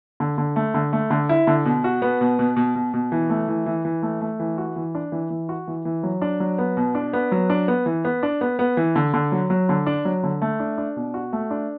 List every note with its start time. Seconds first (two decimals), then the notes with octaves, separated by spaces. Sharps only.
0.20 D3
0.38 D3
0.56 A3
0.74 D3
0.93 A3
1.11 D3
1.29 E4
1.47 D3
1.65 B2
1.84 F#4
2.02 B3
2.21 B2
2.39 B2
2.56 B2
2.75 B2
2.94 B2
3.12 E3
3.30 A3
3.48 E3
3.66 E3
3.85 E3
4.03 A3
4.21 A3
4.40 E3
4.58 F#4
4.76 E3
4.95 D4
5.12 E3
5.30 E3
5.49 F#4
5.68 E3
5.85 E3
6.03 F#3
6.22 D4
6.40 F#3
6.58 B3
6.77 B2
6.95 D4
7.13 B3
7.32 F#3
7.50 D4
7.68 B3
7.86 E3
8.05 B3
8.23 D4
8.41 B3
8.59 B3
8.77 E3
8.96 D3
9.14 D3
9.32 F#3
9.50 F#3
9.69 D3
9.86 D4
10.05 F#3
10.24 D3
10.42 A3
10.60 D4
10.78 D4
10.96 B2
11.14 F#4
11.33 A3
11.51 D4